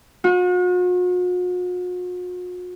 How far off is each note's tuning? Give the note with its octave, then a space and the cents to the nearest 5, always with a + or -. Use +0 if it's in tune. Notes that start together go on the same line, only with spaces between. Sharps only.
F#4 -45